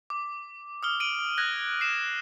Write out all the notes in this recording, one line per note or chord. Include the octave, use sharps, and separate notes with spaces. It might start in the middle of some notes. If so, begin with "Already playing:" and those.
D6
D#6 F6 G7
D7 D#7 F#7
F#6 G#6 A#6
C7 E7